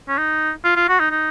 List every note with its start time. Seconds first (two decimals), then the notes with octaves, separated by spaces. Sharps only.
0.08 C#4
0.18 D#4
0.64 F4
0.76 F4
0.89 F#4
1.00 D#4
1.11 D#4